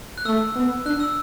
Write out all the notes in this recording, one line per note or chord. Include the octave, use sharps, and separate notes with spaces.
F#6
A3 E6
B3
D4 F#6
E6